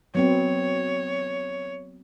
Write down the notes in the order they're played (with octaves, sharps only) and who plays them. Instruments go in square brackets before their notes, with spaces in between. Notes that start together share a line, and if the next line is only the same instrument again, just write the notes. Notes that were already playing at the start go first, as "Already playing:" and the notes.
[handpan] F#3 B3 C4 [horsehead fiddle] C#5